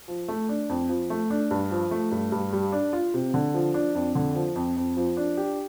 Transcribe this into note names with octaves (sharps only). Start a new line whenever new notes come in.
F3
A3
D4
F2
F3
A3
D4
G2
F3
A3
G2
G2
G3
D4
F4
C3
D3
F3
D4
F2
D3
F3
F2
F2
F3
D4
G4